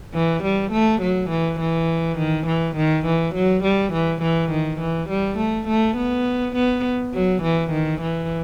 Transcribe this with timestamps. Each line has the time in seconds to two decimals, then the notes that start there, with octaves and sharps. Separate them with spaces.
0.14 E3
0.43 G3
0.72 A3
1.01 F#3
1.30 E3
1.60 E3
2.18 D#3
2.47 E3
2.76 D#3
3.06 E3
3.35 F#3
3.64 G3
3.93 E3
4.22 E3
4.51 D#3
4.80 E3
5.09 G3
5.38 A3
5.68 A3
5.96 B3
6.55 B3
7.14 F#3
7.42 E3
7.71 D#3
8.01 E3